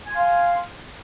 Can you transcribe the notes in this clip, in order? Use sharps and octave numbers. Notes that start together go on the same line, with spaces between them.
F5 G#5 C6